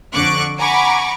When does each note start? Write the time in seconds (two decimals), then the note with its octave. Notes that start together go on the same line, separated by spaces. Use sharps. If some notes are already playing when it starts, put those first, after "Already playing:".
0.13 F2 D3 C#6 D6 F#6
0.57 F#5 G#5 A#5 B5 C#6 D6